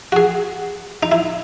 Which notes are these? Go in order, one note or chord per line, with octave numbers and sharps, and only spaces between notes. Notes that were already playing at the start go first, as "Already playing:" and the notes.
F#4
G#4
D#4
E4